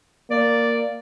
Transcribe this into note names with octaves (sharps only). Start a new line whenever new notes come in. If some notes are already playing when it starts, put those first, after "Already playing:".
A#3 D5